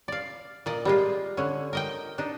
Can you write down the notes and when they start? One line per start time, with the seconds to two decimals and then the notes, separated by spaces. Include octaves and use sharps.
0.08 D5 F5
0.66 A#2 D5 D#5
0.85 G3 G#3 F4
1.37 D3 C#4
1.73 A#4 D#5 G5
2.18 D4 D#4